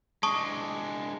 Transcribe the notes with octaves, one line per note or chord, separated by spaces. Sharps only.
G#3 D4 A5 C#6 D#6